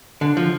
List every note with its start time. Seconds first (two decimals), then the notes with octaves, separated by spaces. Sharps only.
0.21 D3
0.37 F3